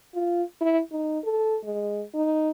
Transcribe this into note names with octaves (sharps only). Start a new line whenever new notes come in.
F4
E4
D#4
A4
G#3
D#4